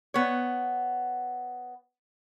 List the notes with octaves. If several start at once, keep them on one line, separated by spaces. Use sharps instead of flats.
B3 C#5